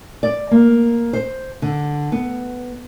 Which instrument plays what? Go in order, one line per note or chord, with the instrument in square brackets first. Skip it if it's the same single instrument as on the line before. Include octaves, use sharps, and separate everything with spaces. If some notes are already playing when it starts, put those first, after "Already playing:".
[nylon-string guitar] D5
A#3
C5
D3
B3